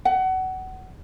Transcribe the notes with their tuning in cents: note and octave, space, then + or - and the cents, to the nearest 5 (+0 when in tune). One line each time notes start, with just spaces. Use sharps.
F#5 +25